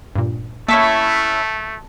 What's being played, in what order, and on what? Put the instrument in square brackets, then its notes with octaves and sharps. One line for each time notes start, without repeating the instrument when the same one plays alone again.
[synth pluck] G2 A#2
[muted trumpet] A3 [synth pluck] A#3 E7 [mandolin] C#4 E4 E5 [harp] A5 C#6